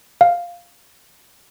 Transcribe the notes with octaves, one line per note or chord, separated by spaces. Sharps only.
F5